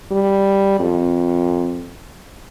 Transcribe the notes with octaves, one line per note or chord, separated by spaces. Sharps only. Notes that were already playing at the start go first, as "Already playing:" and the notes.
G3
F2